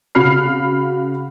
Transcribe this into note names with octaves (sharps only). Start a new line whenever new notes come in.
C#3 F#4 B5 F6 C7